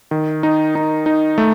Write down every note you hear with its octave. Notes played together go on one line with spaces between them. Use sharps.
D#3
D#4
D#4
D#4
A3